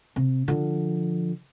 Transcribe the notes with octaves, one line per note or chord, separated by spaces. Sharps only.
C3
D3 F3